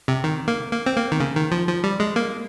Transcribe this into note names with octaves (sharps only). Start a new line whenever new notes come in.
C3
D#3
A#3
A#3
C4
A#3
D#3
C#3
D#3
F3
F3
G3
G#3
A#3